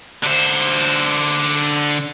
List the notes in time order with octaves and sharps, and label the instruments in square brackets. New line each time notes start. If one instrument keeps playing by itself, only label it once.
[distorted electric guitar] D3 C5